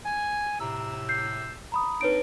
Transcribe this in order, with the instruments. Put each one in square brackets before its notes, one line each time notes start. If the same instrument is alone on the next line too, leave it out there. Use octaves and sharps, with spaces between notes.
[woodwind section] G#5
[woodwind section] A2 C3 E6 [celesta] A#5
[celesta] G6 C7
A#5 B5 D#6
[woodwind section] F2 D4 D#4 [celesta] B4 C#5 D7